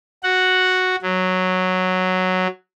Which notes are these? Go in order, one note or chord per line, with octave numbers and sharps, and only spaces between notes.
F#4 F#5
F#3